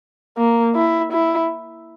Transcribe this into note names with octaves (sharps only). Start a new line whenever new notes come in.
A#3
E4
E4